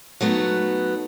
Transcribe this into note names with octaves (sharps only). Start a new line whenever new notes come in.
F#3 A3 B3 D#4